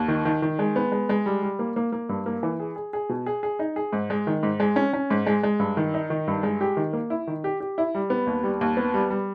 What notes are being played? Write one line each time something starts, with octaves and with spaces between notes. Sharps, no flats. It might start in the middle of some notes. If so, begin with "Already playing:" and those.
Already playing: D#2
D#3
D#3
D#3
G#3
B3
G#3
G#3
G3
G3
A#3
A#3
A#3
G2
A#3
E3
G#4
G#4
G#4
B2
G#4
G#4
D#4
G#4
G#2
G#3
D#3
G#2
G#3
C#4
C#4
G#2
G#3
G#3
G2
D#3
D#4
D#3
G2
G#3
G4
D#3
A#3
E4
D#3
G4
G4
E4
G3
B3
D#2
G3
D#2
B3
G3
G3